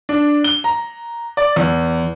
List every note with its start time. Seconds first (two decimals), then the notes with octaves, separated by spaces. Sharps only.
0.09 D4
0.44 G7
0.64 A#5
1.37 D5
1.56 E2